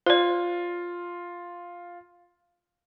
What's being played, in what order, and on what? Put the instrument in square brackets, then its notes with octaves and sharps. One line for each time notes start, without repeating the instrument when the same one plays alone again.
[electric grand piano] F4 [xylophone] C5 D5